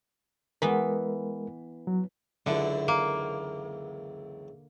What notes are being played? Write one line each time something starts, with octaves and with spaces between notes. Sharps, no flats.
E3 G#3 B3 A#4
F#3
C#2 F#2 D3 E3
A#3